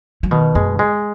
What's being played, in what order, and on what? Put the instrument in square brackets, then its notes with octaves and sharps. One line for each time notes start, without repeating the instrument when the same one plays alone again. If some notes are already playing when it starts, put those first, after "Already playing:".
[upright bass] F#3
[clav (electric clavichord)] B2 [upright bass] D#3
[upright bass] F#2 [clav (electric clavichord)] G#3
[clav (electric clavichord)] G#3